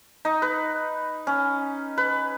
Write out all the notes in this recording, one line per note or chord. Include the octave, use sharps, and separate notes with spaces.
D#4
B4
C#4
B4